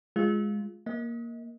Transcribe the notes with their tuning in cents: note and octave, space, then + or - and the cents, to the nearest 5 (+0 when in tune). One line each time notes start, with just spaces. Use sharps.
G#3 +0 F4 +0
A#3 +5 D#5 +30